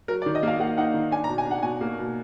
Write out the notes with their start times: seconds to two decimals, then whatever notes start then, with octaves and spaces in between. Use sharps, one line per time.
0.08 F#3 A#4
0.22 D5
0.26 D#3
0.35 D#5
0.43 A#3 F5
0.60 A#3 F#5
0.78 D#4 F#5
0.94 D#3
1.11 D4 G#5
1.24 A#5
1.29 B2
1.38 G#5
1.45 D4
1.51 F#5
1.63 B2 G#5
1.81 A#3
1.98 B2